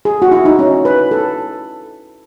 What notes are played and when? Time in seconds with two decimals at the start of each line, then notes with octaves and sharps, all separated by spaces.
0.05 G#4
0.22 F#4
0.32 E4
0.45 D#4
0.59 C#4
0.85 B4
1.11 A4